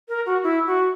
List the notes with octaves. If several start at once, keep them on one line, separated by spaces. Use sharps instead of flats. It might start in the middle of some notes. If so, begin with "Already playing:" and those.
A#4
F#4
E4
F#4